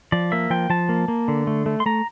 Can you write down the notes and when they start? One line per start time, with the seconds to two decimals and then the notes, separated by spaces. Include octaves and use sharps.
0.12 F3 D5
0.32 A#3 E5
0.50 F3 G5
0.70 F3 A5
0.89 A#3
1.08 A#3
1.28 D3
1.47 A3
1.66 A3
1.80 C6
1.86 A3 A#5